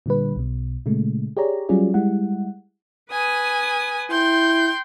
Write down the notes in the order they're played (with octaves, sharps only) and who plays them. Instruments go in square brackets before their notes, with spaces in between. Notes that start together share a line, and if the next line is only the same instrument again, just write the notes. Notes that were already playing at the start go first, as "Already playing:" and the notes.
[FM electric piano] A#2 D3 G3 B4
B1 B2
A#2 C#3 G#3 A3
G4 G#4 C#5 D5 A#5
F#3 G3 C#4 F4 G#4 D5
G3 G#3 E4 F#5
[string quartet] B4 G#5 D#6
[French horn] E4 [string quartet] G5 C6 G6